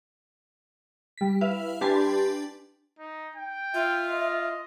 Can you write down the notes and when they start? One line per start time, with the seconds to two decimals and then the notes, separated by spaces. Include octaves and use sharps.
1.18 G3 B6
1.41 E4 B4 E5 F5
1.81 D4 G4 B4 G#5 A5 C6
2.99 D#4
3.35 G5
3.74 F4 E5
4.10 D#5